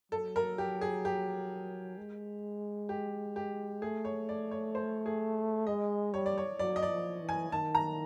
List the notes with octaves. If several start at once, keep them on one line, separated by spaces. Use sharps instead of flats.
F#3 A4
A#4
G4
G#4
G4
G#3
G4
G4
A3 G#4
C#5
D5
C#5
C5
G#4
G#3 D#5
G3 C#5
D5
C#5
F#3 D5
D#5
D5
F3
E3
G#5
D#3 A5
A#5